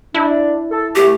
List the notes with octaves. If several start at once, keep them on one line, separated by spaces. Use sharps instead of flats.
D4 E4
A4
C2 A3 G4